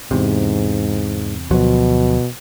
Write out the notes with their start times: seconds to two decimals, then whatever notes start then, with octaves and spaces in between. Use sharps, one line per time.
0.11 E2 G#2 C3
1.51 D2 B2 F3 F#3